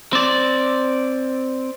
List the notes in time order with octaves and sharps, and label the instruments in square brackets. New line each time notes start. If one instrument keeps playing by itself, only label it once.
[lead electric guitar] C4 D5